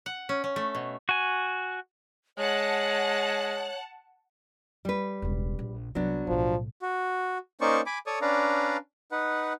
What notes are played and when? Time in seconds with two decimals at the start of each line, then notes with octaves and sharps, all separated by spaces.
0.06 F#5
0.29 C#4
0.44 C#4
0.56 A3
0.75 B2
1.09 F#4 G#5
2.38 G#3 C#5 F#5 A5 F#6
4.85 G3 B4
5.22 E1 C#2
5.59 A#1
5.95 C2 F#3 B3 D4
6.27 B1 A2 F3
6.82 F#4
7.61 A#3 C#4 D#4 C5 D5 C#6
7.86 G#5 B5 D6
8.07 A4 C#5 D5 C#6 D#6
8.22 C#4 D4 B4 D5 F5 A#5
9.12 D#4 B4 F#5